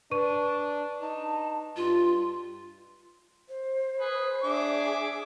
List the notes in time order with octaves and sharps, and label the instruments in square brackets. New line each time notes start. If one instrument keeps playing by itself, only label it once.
[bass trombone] D4 [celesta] B4 C#6 D#7
[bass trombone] D#4 [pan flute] A5
[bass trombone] G2 [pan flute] F4
[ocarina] C5
[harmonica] G#4 B4
[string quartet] D4 G#4 [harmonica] E5 D6